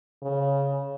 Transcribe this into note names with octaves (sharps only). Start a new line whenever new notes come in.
C#3